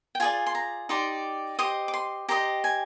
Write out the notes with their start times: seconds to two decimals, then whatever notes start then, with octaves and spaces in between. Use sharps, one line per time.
0.15 G5
0.20 F4 G#4 D5 G#5
0.46 C6
0.55 A#5
0.89 D#4 G4 D5 C6
1.59 G4 C5 D#5 D#6
1.88 D6
1.94 C6
2.29 G4 C5 D#5 A#5
2.64 G#5